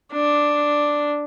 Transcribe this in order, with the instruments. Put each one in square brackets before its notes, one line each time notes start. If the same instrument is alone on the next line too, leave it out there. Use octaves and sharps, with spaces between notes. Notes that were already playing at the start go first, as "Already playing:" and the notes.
[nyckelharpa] D4